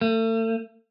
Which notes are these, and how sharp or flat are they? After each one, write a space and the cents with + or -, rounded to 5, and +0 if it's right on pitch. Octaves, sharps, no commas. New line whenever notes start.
A3 +35